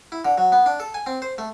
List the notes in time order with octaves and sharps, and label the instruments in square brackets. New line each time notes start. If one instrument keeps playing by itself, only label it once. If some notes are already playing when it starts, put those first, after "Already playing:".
[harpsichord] E4
D3
F#3
B3
D4
A4
G#5
C4
C5
A3